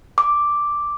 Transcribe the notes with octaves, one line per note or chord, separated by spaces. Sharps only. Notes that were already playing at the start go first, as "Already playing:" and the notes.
D6